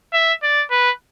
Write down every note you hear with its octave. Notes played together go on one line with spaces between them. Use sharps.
E5
D5
B4